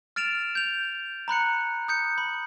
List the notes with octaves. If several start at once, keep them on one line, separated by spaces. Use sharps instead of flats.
F6 A6 D7 E7 F7
G6 F7
A#5 B5 F#6 C#7
D#6 G6 C#7
B5